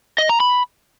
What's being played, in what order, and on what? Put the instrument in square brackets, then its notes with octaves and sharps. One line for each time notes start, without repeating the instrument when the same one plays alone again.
[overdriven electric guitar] D#5
A#5
B5